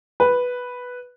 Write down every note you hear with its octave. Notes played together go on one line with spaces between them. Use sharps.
B4